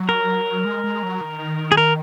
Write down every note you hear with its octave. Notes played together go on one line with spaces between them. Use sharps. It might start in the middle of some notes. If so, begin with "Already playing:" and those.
Already playing: F#3
A#4
G#3
G#3
F#3
D#3
G#4
A#4